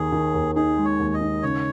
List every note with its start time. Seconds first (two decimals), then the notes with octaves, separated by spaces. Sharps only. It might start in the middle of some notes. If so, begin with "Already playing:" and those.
Already playing: D#2 D#3 G#4
0.12 D#3
0.34 D#2
0.55 D#4 G#4
0.77 G#3
0.85 C#5
1.00 D#2
1.14 D#5
1.21 D#4
1.42 C#3 C#5